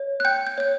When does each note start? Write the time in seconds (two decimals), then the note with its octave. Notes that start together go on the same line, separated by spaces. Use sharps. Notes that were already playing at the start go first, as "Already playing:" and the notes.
Already playing: C#5
0.20 F#6
0.25 G5 G6
0.47 G6
0.58 C#5 G6